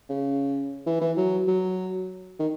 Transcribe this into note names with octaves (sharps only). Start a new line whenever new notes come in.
C#3
E3
E3
F#3
F#3
D#3